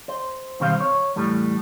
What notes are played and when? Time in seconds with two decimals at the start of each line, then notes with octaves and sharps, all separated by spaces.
0.08 C5
0.60 B1 D#3 G3 C4 C5 F5
0.80 C#5
1.16 E2 A2 G3 A3